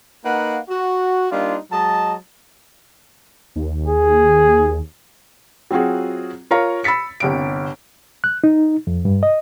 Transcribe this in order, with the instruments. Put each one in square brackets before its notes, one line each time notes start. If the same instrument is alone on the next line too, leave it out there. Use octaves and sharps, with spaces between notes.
[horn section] A#3 D#4 B4 F5 F#5
F#4
G3 A#3 D4 D#4 F4
F#3 G#3 D#5 A5
[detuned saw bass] D#2
[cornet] G#4
[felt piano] F#3 C4 F4 F#4 G#4
F4 A#4 C#5 F5 A#5 C#6
B5 E6 A6 B6 C#7
G1 C2 D7
[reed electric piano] F#6
D#4
F2
G2
D#5